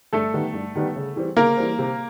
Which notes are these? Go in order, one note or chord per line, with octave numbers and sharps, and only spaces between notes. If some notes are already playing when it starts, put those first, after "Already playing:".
G2 A3 A4
D#3 G3 B3
G2
D#3 G3 B3
C#3
E3 G3 C4
C#3 A#3 A#4
E3 G3 C4
C3